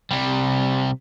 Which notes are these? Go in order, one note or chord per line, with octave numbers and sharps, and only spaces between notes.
C3 G3